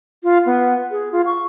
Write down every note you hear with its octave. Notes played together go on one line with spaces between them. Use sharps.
F4
B3
G#4
F4
C#6